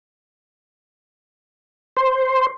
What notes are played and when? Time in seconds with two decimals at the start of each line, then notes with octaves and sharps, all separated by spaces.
1.97 C5